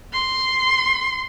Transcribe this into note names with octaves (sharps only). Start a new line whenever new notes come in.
C6